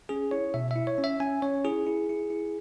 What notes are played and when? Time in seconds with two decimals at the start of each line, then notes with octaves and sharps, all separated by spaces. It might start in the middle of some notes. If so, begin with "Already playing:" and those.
0.09 C#4 G#4
0.31 E4 C#5
0.54 B2 E5
0.71 E4 E5
0.87 C#5
0.98 C#4
1.04 E5
1.20 C#4 G#5
1.42 C#4 C#5
1.65 E4 G#4
1.87 E4
2.09 E4
2.30 E4